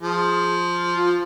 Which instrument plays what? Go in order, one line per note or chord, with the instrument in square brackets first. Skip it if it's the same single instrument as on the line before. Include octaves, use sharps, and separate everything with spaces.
[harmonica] F3 [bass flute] G#4
[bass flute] F4